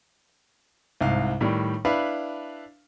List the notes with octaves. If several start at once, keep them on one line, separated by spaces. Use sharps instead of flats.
C2 G#2 F5
A2 D#3 G3
D4 E4 B4 F5